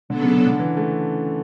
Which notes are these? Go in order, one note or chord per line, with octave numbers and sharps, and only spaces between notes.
D3 F#3 B3 D4 A4
C#3
C#3
D3
E3
A3